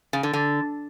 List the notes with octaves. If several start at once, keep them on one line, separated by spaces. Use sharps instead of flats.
C#3
D3
D3